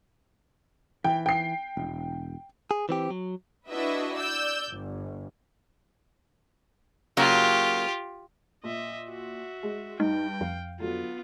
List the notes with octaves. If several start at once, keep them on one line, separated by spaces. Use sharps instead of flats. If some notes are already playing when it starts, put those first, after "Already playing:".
E3 G5
G5 C7
E1
G#4
E3 C4 G4
F#3
D4 E4 F#4 B4 D#5 E5
D5 E6 G6
G1
C#3 F#3 A#3 F4 G4
A#2 D#5 E5
F#4 E5
G#3
G2 D#4 G5
F2 F5
D3 F#3 B3 F4